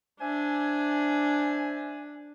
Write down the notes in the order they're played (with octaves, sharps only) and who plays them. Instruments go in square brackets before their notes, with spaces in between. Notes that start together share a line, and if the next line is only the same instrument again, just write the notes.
[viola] D4 [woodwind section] C5 E5 G#5